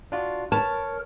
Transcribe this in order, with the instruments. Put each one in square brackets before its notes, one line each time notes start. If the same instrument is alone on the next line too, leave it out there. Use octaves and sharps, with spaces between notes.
[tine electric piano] D4 F4 F#4
[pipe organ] A#4 [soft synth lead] B4 [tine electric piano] C#5 [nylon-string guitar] A5